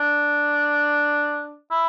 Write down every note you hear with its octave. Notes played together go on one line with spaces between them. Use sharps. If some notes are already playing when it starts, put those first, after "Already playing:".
Already playing: D4
E4